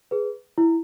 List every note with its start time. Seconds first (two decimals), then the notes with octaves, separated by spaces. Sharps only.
0.11 G#4 B4
0.58 E4